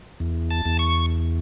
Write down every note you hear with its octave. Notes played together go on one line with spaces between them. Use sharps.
E2
A5
E2
C#6